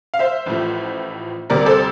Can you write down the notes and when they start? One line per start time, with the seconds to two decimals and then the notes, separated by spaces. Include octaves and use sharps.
0.14 F5
0.19 C5 E5
0.46 A1 A2 F3 A3
1.50 D2 C3 G3 A#3 A#4 D5
1.66 A4 C5